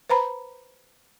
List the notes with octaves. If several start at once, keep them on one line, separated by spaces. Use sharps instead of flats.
B4 C5 A#5 B5